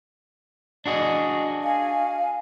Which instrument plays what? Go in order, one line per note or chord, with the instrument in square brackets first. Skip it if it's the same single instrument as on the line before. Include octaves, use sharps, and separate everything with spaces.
[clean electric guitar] D4 F#4 G#4 [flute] D#5
[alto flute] F5 [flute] G#5